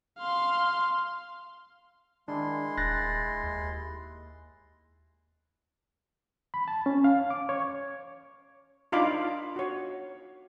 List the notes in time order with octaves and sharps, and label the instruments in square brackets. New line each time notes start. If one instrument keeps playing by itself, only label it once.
[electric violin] F5 C6
[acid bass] D#3 [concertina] G#3 E4 C6 [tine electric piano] D4
[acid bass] D#1 [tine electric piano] F#6 A6 A#6
[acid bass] D#2
[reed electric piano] B5
A5
C#4
F5
D6
C#5
[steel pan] D4 D#4 F4 F5 B5 D6
F#4 C#5